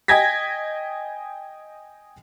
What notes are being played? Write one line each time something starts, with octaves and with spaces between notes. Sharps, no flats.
D#5 G5 G#5 G#6 A#6 B6